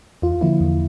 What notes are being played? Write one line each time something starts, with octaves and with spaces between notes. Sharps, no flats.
E2 F4
D3 F3 A#3 E4
E2